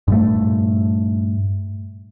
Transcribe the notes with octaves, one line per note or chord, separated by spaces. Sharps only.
G2 A#2 A3